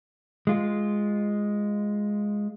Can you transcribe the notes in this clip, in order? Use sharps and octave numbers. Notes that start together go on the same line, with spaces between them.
G#3 F4